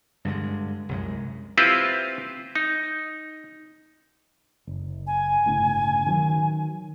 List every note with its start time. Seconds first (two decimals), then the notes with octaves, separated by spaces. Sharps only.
0.25 G2 D3 G#3
0.89 C2 F#2 G#3
1.58 C4 E4 F4 G4 B4 C5
2.55 D#4
4.67 F#1
5.07 G#5
5.46 G1 A2 C#3
6.06 D#3 E3 F#3